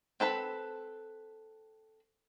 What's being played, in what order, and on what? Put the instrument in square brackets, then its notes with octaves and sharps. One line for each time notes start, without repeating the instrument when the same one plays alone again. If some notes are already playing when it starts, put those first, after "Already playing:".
[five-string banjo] C4 A4 B4 B5